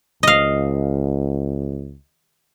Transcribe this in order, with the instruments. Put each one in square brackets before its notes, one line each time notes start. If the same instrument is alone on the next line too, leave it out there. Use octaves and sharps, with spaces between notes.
[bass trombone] C#2 [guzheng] D#5 F5